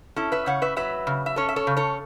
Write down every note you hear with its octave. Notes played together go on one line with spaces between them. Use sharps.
C#4 E4 A4
B4 E5
C#3 C#5 F#5
B4 E5
F#3 B4 E5
C#3
E5
C#4 A4 C#5
E5
A4 C#5
C#3
A4 C#5